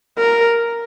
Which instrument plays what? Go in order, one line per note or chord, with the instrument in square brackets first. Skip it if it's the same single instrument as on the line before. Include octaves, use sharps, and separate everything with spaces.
[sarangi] A#4